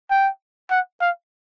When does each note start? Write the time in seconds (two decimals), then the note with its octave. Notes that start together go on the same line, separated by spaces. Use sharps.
0.10 G5
0.71 F#5
1.01 F5